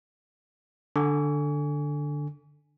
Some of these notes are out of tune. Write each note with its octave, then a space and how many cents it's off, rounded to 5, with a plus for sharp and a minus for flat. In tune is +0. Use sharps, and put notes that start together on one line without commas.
D3 +0 G#5 +0 C#6 +45